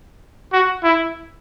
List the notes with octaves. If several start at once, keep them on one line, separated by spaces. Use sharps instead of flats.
F#4
E4